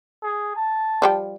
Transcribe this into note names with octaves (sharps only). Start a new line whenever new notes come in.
G#4
A5
F3 G3 G5